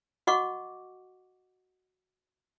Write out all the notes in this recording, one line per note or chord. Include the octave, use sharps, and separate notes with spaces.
F#4 D#5 F#5 C#6 D6